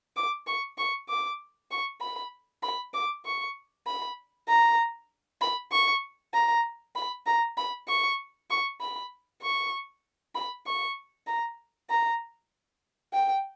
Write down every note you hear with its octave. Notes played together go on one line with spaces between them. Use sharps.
D6
C#6
C#6
D6
C#6
B5
B5
D6
C#6
B5
A#5
B5
C#6
A#5
B5
A#5
B5
C#6
C#6
B5
C#6
B5
C#6
A#5
A#5
G5